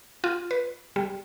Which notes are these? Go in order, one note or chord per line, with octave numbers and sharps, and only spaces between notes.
F4
B4
G3